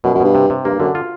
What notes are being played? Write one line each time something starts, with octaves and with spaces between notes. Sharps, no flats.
F#2 B2
F#2
G2 B2
C3
C3
G2 A#3
F#2 D3
F4